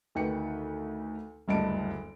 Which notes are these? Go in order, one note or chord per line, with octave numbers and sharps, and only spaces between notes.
D2 D#3 B4 G5 C#7
F#1 D2 G2 D#5 A5 D7